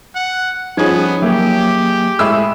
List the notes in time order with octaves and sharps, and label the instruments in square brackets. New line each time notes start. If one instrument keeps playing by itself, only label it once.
[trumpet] F#5
[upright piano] F3 C#4 [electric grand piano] G3 G#4 [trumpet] B3 [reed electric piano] D#4 G#6
[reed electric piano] F#3 A#3 [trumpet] G4 [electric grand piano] G#4 E5
[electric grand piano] A2 G#3 G#4 [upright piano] E5 B5 E6